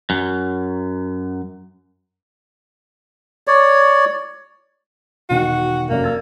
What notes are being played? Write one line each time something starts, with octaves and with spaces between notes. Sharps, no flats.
F#2
C#5 D5
E1 D#3 F#4
F1 F#2 A#3 D5
E6 G#6 A6